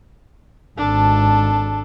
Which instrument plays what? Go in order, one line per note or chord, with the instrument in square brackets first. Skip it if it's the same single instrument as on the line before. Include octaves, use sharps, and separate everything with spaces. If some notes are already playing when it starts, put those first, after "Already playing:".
[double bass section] G#1 [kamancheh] D4 A4